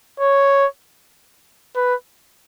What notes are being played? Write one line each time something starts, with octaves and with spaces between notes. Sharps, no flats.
C#5
B4